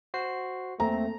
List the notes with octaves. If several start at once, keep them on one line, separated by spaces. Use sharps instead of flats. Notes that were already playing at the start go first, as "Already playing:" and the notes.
F#4 C5 C7
E2 A3 A#3 C4 A#5